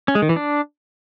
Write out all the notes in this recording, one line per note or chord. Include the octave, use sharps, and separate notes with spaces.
C#4
G#3
D#3
E3
D4